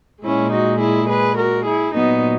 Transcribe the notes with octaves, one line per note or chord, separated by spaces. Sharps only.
A#2 G#3 C#4 E4
D#4 F#4
E4 G#4
G#4 B4
F#4 A#4
E4 G#4
A#2 B3 D#4
F#3